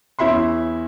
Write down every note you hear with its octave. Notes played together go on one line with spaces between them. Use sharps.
E2 C#4 E4 E5 B5 C6